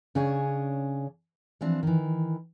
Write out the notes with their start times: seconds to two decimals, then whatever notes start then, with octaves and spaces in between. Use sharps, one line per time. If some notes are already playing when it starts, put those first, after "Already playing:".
0.15 C#3 C#4 D4 G#4 C#5 G#5
1.61 E3 F3 C4 D4
1.83 D#3 E3